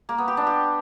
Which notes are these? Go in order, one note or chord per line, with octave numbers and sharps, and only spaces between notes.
A#3
B3
G4
D4
G4